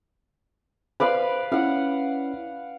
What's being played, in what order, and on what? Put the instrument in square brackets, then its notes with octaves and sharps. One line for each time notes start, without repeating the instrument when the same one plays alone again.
[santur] B4 D5 F5 [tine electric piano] C5
[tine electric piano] C#4 E4 [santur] F5 F#5